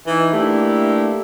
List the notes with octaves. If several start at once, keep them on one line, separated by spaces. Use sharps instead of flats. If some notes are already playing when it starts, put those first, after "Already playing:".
E3 D#4
A3 A#3 D4 E4 G4